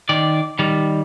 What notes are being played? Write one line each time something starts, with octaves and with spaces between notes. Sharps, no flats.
D#3 D5
D#3 G3